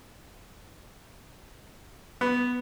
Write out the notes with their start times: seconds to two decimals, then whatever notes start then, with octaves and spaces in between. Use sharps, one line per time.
2.21 B3